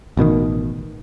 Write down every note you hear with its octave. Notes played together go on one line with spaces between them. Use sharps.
A1 B2 D3 D#3